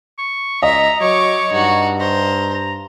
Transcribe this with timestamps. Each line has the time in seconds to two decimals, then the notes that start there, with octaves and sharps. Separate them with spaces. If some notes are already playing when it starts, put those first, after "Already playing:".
0.18 C#6
0.63 C#2 D#5 E5 A#5
1.01 F#3 C#5 C#6 D6
1.53 G2 D#4 F#4
2.00 C5 A#5
2.54 A#5